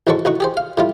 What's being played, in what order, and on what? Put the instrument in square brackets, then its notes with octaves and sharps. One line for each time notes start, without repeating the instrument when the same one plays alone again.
[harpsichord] A1 G#2 F#3 G#3 A4 C#6
A1 D#4 F#4 C#6
G4 G#4 C5
F5
A2 G3 F4